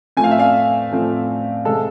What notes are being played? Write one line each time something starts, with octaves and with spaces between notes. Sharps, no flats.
A2 F3 A3 C4 G#5
F5
E5
D5 F5
A2 F3 A3 C4
C3 G#3 A4